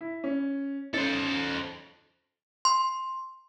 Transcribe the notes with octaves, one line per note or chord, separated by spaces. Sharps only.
E4
C#4
C#4 D#4 A4 C5
C6